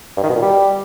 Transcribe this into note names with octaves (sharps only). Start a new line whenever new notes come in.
G2
D#3
B2
A#2
G3